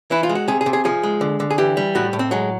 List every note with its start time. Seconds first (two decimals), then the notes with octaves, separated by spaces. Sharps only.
0.11 E3 E4
0.23 F4
0.29 G#3
0.35 F#4
0.48 C3 G#4
0.61 G#4
0.66 C3
0.73 G#4
0.85 F3 G#4
1.03 G#3
1.21 D3
1.40 D3
1.51 G#4
1.58 E3 G4
1.77 G3
1.95 A2 F#4
2.13 A2
2.19 C4
2.31 F#3 G#3